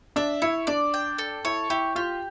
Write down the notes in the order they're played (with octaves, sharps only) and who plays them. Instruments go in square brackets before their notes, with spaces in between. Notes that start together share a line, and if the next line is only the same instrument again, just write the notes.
[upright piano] D4 [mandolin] E5
[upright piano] E4 [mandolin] C#5
[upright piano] D4 [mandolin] D5
[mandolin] G5
A4
[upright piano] E4 [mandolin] C#5
[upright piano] E4 [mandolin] G4
[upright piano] F4 [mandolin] G4